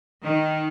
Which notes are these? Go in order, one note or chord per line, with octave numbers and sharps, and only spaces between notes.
D#3